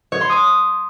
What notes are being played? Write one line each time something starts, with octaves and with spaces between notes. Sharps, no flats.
C#5
C6
D#6